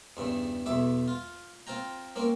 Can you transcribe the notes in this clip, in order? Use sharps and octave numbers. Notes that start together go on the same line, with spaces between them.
E2 G2 C#3
B1 E2 E5 D6
F4
C4 F4 G5 A#5
A#3 C4 C#4